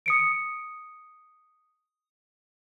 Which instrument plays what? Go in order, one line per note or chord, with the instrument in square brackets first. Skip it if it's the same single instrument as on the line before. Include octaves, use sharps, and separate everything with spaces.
[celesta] D#6 C#7 D7